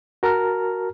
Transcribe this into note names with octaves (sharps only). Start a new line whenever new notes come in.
F#4 A#4 A5 A#5 F6